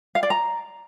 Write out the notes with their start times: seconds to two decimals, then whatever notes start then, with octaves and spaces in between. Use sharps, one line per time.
0.15 F5
0.23 D5
0.30 A#5